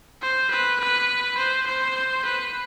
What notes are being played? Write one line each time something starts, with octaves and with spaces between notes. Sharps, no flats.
C5
B4
B4
C5
C5
B4